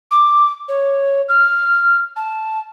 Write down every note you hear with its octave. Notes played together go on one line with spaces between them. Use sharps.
D6
C#5
F6
A5